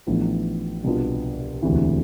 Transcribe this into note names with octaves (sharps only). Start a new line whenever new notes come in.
A1 A2 F3 B3 D4
C2 B2 B3 D4 F4
E1 D2 C3 E3